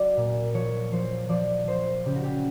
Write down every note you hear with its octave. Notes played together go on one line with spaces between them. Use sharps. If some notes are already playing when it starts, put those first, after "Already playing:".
Already playing: F#3 D5
A#2
F3 C#5
F3 C5
F3 D5
F3 C5
C#3 G4
F#4
G4